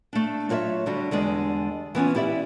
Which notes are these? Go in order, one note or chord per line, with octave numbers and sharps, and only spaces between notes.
A3 D4
F#3 F4 C#5 D5 E5
D3 G3 F#4
E2 D3 G3 G#3
E3 B3 C#4 F4
E4 G4 D5 E5